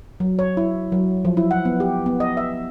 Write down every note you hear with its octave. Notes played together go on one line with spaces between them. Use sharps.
F#3
C#5
E4
F#3
F3
E4
F#5
B3
G4
B3
D#5
E5